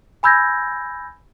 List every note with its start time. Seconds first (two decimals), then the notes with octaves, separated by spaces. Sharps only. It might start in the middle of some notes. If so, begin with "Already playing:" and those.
0.23 G#5 B5 E6 G6 G#6 A#6